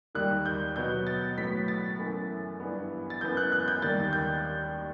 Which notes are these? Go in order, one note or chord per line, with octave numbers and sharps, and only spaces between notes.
D#2 D#3 G3 F#6
G6
B2 F#3 B3 G6
A6
A2 F#3 B3 B6
A6
F#2 E3 A3
G2 E3 B3
A6
F#2 E3 B3 G6
F#6
F#6
G6
D#2 D#3 G3 A6
G6